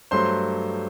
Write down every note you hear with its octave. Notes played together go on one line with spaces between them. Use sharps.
G2 F#3 A3 C5 C6